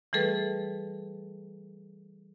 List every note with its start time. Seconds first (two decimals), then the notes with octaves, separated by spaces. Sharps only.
0.13 E3 G3 A3 G#4 A4 B4